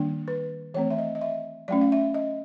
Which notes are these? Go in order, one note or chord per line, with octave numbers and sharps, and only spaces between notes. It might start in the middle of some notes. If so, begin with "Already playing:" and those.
Already playing: D#3 G3 A#3 D4
B4
E3 A3 C4 C#5
E5
D#5
D#5
E5
F#3 A3 C#4 D5
F5
E5
D#5